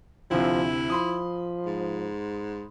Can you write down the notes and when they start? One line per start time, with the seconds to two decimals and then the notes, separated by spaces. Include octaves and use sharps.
0.31 D2 C3 F3 E4
0.90 F3 B5 C6 D#6
1.66 G#2